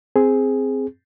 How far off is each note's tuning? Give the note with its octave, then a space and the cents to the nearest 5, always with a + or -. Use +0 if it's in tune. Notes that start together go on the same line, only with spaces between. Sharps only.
C4 +0 G#4 +0